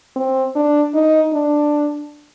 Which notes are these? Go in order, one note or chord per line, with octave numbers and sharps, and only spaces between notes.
C4
D4
D#4
D4